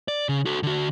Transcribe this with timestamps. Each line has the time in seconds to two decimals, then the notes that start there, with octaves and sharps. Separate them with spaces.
0.08 D5
0.29 C#3
0.46 F#4 A4
0.63 D3 F#4